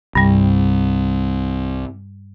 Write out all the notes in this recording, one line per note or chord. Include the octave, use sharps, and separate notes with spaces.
C2 G2 G3